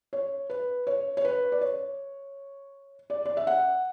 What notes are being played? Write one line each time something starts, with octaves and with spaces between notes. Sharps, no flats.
C#5
B4
C#5
C#5
B4
D5
C#5
D5
D5
E5
F#5